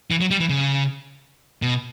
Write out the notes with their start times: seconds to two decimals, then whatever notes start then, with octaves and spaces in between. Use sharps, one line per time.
0.11 E3
0.21 F#3
0.31 G3
0.40 E3
0.49 C#3
1.62 B2